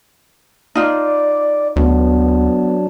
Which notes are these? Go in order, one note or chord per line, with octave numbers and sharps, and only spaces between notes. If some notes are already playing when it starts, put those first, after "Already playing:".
D#4 F4 D5
D2 F#3 B3 D4